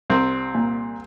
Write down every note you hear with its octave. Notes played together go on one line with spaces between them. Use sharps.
C2 C4
A#2